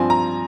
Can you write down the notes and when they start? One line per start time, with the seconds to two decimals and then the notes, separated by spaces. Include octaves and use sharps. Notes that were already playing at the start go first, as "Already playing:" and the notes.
Already playing: G2 F3 C4 G#5
0.10 A#5